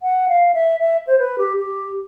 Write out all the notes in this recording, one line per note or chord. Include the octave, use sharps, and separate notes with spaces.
F#5
F5
E5
E5
C5
B4
G4
G4